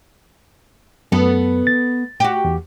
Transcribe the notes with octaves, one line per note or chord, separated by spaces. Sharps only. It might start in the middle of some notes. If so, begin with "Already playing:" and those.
F#2 B3 A4
A6
F#4 G4
E2